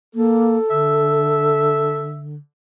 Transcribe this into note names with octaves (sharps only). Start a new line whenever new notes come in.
A#3 A4
D3 E5